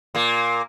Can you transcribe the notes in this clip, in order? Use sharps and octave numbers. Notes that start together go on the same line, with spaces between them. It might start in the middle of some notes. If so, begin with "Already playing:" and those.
A#2 A#3